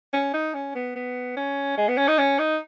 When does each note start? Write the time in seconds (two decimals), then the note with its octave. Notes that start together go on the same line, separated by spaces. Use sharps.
0.13 C#4
0.33 D#4
0.54 C#4
0.75 B3
0.95 B3
1.37 C#4
1.77 G#3
1.88 B3
1.97 C#4
2.08 D#4
2.18 C#4
2.39 D#4